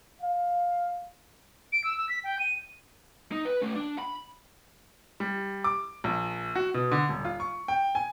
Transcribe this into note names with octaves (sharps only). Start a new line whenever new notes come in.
F5
D7
E6
E6
B6
G5
D#7
D#4
B4
A3 C#4
D4
B5
G3
D6
A#1
F#4
B2
D3
D#1
F4
C#6
G5
G#5